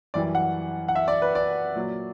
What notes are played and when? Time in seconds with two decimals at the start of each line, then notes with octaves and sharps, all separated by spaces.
0.14 F#2 E3 G3 D5
0.35 F#5
0.88 F#5
0.95 E5
1.08 D5
1.22 B4
1.35 D5
1.76 A#2 F#3